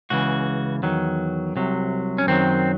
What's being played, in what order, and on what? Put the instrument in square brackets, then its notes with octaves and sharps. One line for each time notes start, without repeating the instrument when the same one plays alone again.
[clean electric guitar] C#2 C#3 E3 F#4
E2 D#3 F#3
C2 C3 F#3
C#4
F#2 D#3 F#3 C4